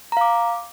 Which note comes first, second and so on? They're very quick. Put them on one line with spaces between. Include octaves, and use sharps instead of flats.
A#5 F5 D6